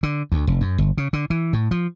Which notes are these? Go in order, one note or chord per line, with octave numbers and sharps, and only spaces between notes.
D3
D2
F1
F#2
G1
C#3
D3
E3
A2
F3